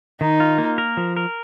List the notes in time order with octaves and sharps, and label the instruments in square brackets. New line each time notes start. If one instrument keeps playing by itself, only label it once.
[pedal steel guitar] D#3 [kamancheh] D#4
[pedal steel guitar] F4
A#3
A#4
F3
A#4